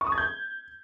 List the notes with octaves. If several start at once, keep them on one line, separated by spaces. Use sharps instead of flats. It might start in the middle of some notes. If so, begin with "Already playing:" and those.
C#6
D#6
G#6
G6